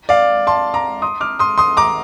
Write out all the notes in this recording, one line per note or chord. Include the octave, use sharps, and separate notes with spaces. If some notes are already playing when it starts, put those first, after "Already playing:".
D5 F5
A5 C6
A#5 D6
C6 D#6
D6 F6
C6 D#6
C6 D#6
A#5 D6